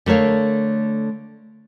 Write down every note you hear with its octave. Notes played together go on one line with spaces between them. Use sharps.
D3 A3 A#4 C#5 F5